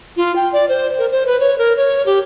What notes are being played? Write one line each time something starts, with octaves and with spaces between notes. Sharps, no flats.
F4
G5
D5
C5
A#4
C5
B4
C#5
A#4
C#5
G4